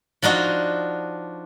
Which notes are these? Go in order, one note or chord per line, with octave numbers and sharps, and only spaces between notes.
F3 D4 D#4 F#4